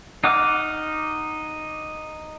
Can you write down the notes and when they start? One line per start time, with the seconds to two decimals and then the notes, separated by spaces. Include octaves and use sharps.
0.24 D#4 F#5 D6 F6